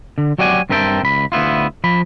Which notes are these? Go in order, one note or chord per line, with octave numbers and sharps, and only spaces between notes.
D3
F#3 F#4 G4 D5 F#5 G#5
G2 C4 A#4 E5 G5 A5
C#2 B5
D2 B3 E4 F4
F3 B5